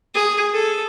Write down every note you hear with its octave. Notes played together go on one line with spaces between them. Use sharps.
G#4
A4